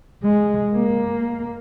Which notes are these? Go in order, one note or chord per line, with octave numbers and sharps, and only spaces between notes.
G#3
A#3